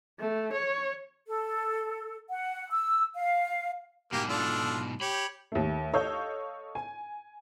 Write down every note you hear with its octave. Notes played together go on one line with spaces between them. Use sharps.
A3
C#5
A4
F#5
E6
F5
G#2 B2 A#3 G4
D4 F4 A4
G4 C#5 B5
D#2 A3
A4 C#5 D#5 F5 E6 G6
G#5